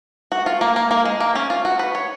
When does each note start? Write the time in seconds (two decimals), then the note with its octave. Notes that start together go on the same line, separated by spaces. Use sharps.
0.32 F#4
0.46 F4
0.61 A#3
0.76 A#3
0.91 A#3
1.05 G#3
1.20 A#3
1.35 C#4
1.50 F4
1.65 F#4
1.79 B4
1.95 C#5